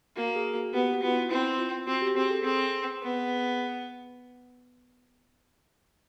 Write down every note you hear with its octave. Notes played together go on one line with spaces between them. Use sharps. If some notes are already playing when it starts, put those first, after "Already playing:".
A#3 F#4
G#4
F#4
B3 G4
F#4
B3 F4
E4
C4 E4
F4
C4 F#4
G4
C4 G#4
A4
C4 G#4
B3